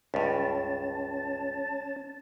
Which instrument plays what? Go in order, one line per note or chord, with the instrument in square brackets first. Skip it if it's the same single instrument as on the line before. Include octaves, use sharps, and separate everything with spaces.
[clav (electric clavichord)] C#2 G2 [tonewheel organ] C#4 A5